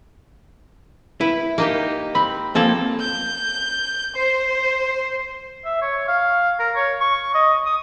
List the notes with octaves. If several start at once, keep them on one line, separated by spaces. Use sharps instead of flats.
E4 B4
A#3 D#4 G4
C4 B5
F3 A#3 C4 A4
G6
C5 C6
E5
C#5
F5
A#4
C#5
C#6
D#5
D#6